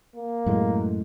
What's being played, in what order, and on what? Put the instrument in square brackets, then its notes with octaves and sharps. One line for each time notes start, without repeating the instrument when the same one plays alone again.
[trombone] A#3
[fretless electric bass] F#2 A2 G#3